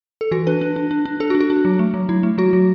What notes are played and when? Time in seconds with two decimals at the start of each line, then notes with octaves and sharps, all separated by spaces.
0.21 A4
0.31 E3 F#4
0.47 D4 B4
0.61 D4
0.76 D4
0.91 D4
1.05 D4
1.20 D4 A4
1.30 F#4
1.35 D4
1.41 F#4
1.50 D4
1.65 F#3
1.79 A3
1.94 F#3
2.09 F#3 E4
2.23 A3
2.38 F#3 F#4
2.53 F#3